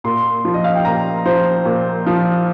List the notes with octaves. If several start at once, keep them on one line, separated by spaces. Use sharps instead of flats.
A#2 C6
F3
D#5
F5
G5
A#2 A#5
F3 C5
A#2
F3